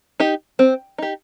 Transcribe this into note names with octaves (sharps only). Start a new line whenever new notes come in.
D#4 G4
C4
D#4 G4